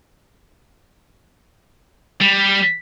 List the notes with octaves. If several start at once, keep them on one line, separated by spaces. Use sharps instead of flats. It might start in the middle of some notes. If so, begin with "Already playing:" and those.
G3